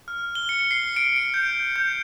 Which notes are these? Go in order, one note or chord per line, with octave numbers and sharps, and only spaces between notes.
F6
G7
C#7
C7
D7
D7
G6
G6